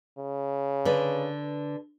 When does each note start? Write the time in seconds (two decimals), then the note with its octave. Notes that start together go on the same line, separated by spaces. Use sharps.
0.18 C#3
0.85 D3 B4 D5